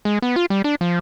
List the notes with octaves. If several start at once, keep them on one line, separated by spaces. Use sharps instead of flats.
G#3
B3
F4
G3
D4
F3